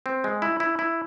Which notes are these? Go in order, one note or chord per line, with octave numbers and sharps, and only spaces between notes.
C4
G#3
E4
E4
E4